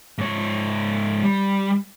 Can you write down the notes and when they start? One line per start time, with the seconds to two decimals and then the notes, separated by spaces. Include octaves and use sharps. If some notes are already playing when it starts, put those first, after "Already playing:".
0.18 G#2 C#5
1.23 G3